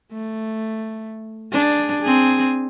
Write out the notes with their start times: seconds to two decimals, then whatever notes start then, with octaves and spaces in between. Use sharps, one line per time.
0.12 A3
1.52 D4 G#4
2.02 C4 G#4